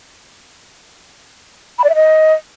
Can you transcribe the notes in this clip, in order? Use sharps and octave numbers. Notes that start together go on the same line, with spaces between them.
B5
D5
E5
D#5